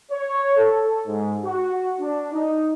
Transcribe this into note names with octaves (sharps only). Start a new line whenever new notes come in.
C#5
A4
G#2
F#4
D4
D#4